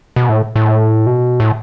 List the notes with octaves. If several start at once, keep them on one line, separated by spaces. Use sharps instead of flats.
B2
A2
A2
B2
A2